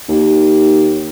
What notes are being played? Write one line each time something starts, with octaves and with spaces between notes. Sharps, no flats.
D#2